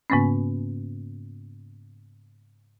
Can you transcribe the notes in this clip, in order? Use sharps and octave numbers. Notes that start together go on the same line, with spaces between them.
G#2 C#3 A#3 B3 C#4